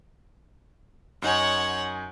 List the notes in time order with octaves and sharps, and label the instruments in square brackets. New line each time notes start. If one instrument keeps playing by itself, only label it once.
[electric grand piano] F#2 D#4 G#5 [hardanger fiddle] C#5 F#5